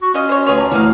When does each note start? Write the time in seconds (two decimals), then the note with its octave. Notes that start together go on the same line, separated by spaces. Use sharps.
0.02 F#4
0.14 C#4 F4 D#5
0.29 C5 C#5
0.46 D2 F4 G#4 B4 C#5 F7
0.58 A5 A#5 D6
0.71 D2 A2 E3 F#4 G#4 F5